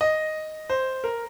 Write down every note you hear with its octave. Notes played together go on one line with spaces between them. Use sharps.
D#5
C5
A#4